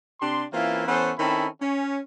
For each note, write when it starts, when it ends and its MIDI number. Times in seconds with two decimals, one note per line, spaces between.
0.21 0.44 48
0.21 0.44 62
0.21 0.44 67
0.21 0.44 84
0.53 0.86 52
0.53 0.86 58
0.53 0.86 60
0.53 0.86 61
0.53 0.86 64
0.53 0.86 65
0.87 1.11 52
0.87 1.11 59
0.87 1.11 61
0.87 1.11 69
0.87 1.11 72
1.18 1.47 51
1.18 1.47 60
1.18 1.47 61
1.18 1.47 64
1.18 1.47 69
1.18 1.47 83
1.61 1.99 61